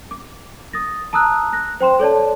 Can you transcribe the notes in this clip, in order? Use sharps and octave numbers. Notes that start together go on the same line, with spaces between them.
D6
D#6 A6 A#6
A5 A#5 D#6 E6 F#6
F#6 A#6
C5 G5 C6 E7
A4 C#5 D5 A5